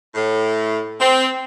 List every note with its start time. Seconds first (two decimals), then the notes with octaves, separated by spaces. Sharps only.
0.15 A2
1.00 C4